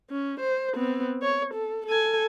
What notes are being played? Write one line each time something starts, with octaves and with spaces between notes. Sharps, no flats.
C#4
C5
B3 C4
C#5
A4
A4 G#5